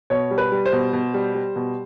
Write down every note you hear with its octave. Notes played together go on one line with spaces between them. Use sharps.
B2 C#5
G3
B4
G3
C5
B2
B2
G3
G3
B2